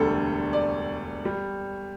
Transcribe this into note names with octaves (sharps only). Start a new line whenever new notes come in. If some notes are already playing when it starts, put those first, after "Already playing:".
Already playing: E1 D2 D3 G3 A4
D5
G3